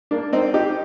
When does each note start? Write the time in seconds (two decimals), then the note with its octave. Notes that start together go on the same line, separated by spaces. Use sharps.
0.11 A#3 D4
0.33 C4 D#4
0.54 D#4 G4